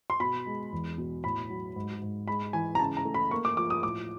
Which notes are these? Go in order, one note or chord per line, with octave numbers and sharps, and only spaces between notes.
C6
B2 B5
G#3
E2
B2
A2 B5
F#3
G#2
G#2
G#3 B5
E3 G#5
A#5
C#3 A5
A#5
A3
B5
A#3 C#6
D6
F3 D6
D#6
A2 D6